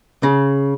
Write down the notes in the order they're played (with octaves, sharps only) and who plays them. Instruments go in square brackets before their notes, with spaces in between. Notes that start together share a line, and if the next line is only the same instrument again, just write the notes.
[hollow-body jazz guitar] C#3